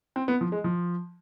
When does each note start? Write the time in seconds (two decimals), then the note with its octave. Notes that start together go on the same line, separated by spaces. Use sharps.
0.16 C4
0.28 B3
0.41 F3
0.52 G#3
0.64 F3